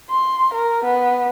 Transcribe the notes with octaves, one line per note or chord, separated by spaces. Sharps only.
C6
A#4
B3